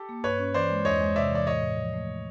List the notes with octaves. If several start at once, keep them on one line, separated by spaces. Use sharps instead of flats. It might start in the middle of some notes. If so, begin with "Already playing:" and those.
Already playing: G4 A4
A#3
G2 B4 C#5
C#4
E3 C5 D5
G#3
E2 C#5 D#5
G#3
C3 D5 E5
E3 D5
A2 C#5 D#5
A2
F3
A3